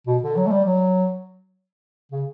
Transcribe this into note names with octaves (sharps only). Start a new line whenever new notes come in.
B2
D3
F#3
A3
G3
F#3
C#3